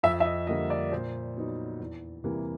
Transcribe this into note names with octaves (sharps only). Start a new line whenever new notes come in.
F2 E5
E5
D#5
D3 G3 A#3 D4 D#5
D5
A#2 C5
F#3 B3 D#4
E2
C3 E3 G3 A#3